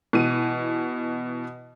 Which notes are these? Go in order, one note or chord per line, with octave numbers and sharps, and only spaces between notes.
B2 E3 D#7